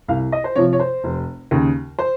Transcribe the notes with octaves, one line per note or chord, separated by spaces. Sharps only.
C2 F5
D#5
C5
C3 F3 C#5
C#5
C5
F1
D#2 C#3
C5